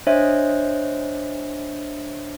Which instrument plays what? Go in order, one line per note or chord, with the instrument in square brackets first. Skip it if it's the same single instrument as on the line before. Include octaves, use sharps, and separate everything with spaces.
[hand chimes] D4 C5 C#5 D#5 E5